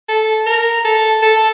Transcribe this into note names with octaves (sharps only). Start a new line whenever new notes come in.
A4
A#4
A4
A4